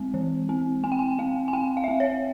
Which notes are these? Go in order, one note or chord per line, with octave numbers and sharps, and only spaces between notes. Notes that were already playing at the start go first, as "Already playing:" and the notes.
Already playing: G#3 C4
E3
C4
C4 G#5
G5
G#5
C4 F5
G#5
C4 G5
F5
E5
C4 F5
C#5